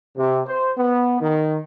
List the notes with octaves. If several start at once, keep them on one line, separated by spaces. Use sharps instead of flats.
C3
C5
B3
D#3